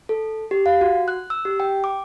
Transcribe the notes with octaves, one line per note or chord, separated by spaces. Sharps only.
A4
G4
F5
F#4
F#6
E6
G4
G5
D6